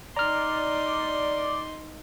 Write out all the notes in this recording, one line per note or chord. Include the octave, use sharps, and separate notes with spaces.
D#4 D5 A#5 C6 F6